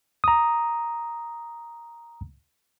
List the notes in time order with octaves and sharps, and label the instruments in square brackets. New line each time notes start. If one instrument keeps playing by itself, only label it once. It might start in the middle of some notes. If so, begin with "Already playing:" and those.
[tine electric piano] A#5 D#6